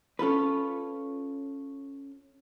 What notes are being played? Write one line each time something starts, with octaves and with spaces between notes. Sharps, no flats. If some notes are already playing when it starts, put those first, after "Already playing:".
C#4 F4 A4 B4